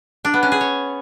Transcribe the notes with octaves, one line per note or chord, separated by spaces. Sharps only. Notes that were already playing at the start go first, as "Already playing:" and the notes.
D4
B3
C#4
G#4
C#5